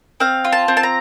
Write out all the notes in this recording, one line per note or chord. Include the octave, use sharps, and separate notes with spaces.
C4 F5
F4
A5
C4
A5
A#5